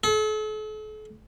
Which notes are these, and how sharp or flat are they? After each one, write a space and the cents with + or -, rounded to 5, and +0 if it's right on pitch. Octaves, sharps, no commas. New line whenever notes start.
A4 -40